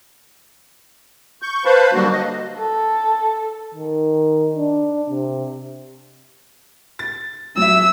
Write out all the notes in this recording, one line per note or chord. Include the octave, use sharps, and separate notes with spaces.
C#6 G6
B4 C5 F5 A5 B5
D3 F#3 G3 A#3 D4 F#4
D#5
A4
D#3
D4
C3
A6
F#3 E5 E6